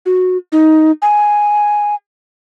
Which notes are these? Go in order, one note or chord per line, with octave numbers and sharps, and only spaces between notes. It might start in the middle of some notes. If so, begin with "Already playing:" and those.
F#4
D#4
G#5